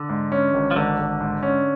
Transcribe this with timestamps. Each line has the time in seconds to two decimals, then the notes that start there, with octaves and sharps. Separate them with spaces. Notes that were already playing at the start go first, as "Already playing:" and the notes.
Already playing: D3
0.09 G#2
0.32 C#4
0.54 G#1
0.71 F3
0.76 G#1 D3
0.99 G#1
1.21 G#2
1.43 C#4